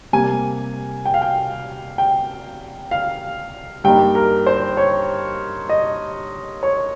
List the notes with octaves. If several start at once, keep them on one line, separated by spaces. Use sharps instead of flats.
C3 G3 A#3 G#5
G5
F5
G5
G5
F5
G2 G3 A#3 D#4 G5
A#4
C5
C#5
D#5
C#5